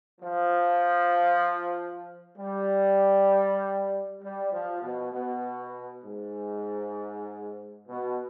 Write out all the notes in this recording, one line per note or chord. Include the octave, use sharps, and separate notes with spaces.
F3
G3
G3
F3
B2
B2
G#2
B2